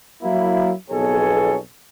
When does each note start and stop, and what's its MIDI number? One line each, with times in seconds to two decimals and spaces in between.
0.23 0.71 54
0.23 0.71 58
0.23 0.71 64
0.91 1.57 35
0.91 1.57 41
0.91 1.57 59
0.91 1.57 68
0.91 1.57 69
0.91 1.57 73